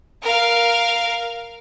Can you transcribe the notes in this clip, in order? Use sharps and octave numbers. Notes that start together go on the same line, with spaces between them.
A#4 F5